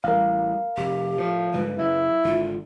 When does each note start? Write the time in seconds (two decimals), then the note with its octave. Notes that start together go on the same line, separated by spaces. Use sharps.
0.04 A1 G3 A#4 F5
0.77 F1 G4
1.18 A2 F3
1.54 G#2 D3 G3 B4
1.78 F#2 C#3 F#3 E4
2.25 G#1 D3 F4